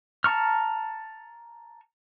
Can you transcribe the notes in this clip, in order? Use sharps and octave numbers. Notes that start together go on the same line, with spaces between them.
A5 A#5 C#6 F6